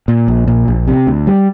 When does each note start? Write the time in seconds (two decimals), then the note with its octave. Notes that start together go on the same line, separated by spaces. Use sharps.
0.08 A#2
0.28 A#1
0.48 A#2
0.68 A#1
0.87 C3
1.07 D2
1.27 G3